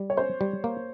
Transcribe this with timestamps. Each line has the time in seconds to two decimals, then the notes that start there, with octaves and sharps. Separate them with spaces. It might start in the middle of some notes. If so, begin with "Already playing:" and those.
Already playing: G3
0.10 C#5
0.17 C#4 C5
0.41 G3
0.64 A#3